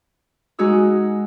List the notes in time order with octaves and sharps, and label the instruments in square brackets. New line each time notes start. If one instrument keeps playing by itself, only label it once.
[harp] G#3 D#4 F#4 G#4 E6